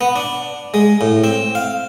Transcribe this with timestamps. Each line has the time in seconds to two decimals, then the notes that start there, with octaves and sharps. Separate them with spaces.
0.01 B3
0.16 D4
0.74 G#3
1.01 A2
1.24 C4
1.55 F5